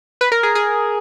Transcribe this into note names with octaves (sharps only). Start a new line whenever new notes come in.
B4
A#4
G#4
G#4